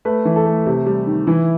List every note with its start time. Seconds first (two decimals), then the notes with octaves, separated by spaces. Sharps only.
0.05 A3 B4
0.25 E3
0.36 A4
0.46 A3
0.66 C3
0.86 G3
1.07 D#3
1.27 E3 E4